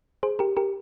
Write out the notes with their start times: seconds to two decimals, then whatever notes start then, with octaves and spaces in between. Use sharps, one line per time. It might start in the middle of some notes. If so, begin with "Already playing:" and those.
0.23 G#4 C5
0.39 G4 A#4
0.57 G4 A#4